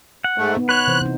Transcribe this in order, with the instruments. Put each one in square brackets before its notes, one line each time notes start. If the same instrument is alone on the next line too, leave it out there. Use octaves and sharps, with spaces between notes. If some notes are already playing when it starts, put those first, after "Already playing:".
[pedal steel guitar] F#5
[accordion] G#2 A3
[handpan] B3 D#4
[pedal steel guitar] B4 C#5 [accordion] F#6
[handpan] C3 E3 C5
C3 D#4